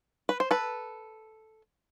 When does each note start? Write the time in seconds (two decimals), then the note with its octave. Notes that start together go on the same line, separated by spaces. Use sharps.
0.29 B4
0.40 C5
0.51 A4 B4